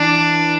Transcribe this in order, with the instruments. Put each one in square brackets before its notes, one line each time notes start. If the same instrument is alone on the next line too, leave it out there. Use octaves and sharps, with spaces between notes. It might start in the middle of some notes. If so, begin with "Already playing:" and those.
Already playing: [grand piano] E3 [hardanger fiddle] D4